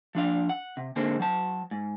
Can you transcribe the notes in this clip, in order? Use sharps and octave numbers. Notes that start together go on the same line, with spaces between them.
F3 D4 F5
F#5
C3
G#2 D3 G#3 A#3 C4
F#3 A5
G#2